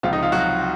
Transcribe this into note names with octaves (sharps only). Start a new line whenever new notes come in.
C#2 C3 F3 F4
D#4
F4
F#3 F#4